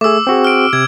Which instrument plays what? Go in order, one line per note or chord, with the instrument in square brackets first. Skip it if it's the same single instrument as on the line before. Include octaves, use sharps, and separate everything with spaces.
[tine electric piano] A3 G#4 [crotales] D6 E6
[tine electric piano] C4 F#4 G#4
[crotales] F6 D7
[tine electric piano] C3 [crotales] G#6